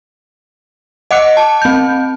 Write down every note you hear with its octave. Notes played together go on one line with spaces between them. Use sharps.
D#5 F#5 D6 F#6 C#7
A5
C4 G6